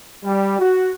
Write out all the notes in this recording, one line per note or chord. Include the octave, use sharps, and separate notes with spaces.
G3
F#4